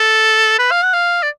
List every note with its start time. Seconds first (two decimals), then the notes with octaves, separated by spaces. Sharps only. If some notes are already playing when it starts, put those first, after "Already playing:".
Already playing: A4
0.59 B4
0.71 F5
0.83 F#5
0.93 F5
1.23 D5